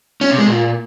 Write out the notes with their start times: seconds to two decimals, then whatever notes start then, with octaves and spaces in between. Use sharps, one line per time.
0.21 C#4
0.30 C3
0.38 G#3
0.47 A#2